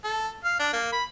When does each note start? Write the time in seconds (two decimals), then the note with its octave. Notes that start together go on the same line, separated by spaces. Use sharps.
0.04 A4
0.45 F5
0.60 D4
0.73 A#3
0.92 B5